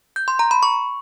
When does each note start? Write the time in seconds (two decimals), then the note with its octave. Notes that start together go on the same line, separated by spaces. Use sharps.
0.16 G6
0.28 C6
0.39 A#5
0.51 B5
0.63 C#6